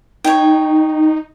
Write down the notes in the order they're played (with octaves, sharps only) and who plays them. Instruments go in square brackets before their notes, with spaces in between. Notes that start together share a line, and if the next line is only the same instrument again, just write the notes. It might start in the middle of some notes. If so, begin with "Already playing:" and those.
[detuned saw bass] D#4 [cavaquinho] C#5 G5